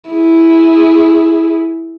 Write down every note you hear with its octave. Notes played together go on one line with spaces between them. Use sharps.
E4 G#4